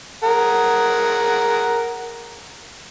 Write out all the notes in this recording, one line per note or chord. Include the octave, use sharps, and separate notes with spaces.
G#4 A#4 F#5